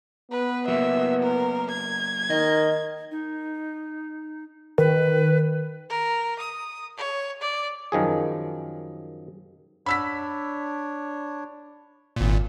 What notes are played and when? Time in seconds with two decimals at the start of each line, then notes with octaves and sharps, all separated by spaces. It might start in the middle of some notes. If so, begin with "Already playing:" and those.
0.32 B3 B4
0.68 F#3 A#3 E5
1.23 A#4
1.71 G#6
2.30 D#3 D#5
3.11 D#4
4.78 D#3 B4
5.89 A#4
6.39 D#6
6.97 C#5
7.41 D5
7.92 F#2 D#3 F3 G#4
9.86 D4 C#5 B5 E6 B6
12.16 G#1 A#2